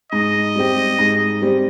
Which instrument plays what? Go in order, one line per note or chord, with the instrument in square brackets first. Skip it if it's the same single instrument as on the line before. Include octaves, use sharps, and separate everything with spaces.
[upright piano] G#2 [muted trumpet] D#5
[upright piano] G3 C4 G4
G#2
G3 C4 G4